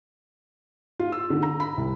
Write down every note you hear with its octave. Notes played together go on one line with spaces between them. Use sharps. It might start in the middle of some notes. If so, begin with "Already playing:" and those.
F4
E6
D3
A#5
B5
C2